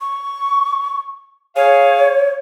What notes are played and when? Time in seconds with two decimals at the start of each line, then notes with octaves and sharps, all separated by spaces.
0.01 C#6
1.56 G#4 C#5 F5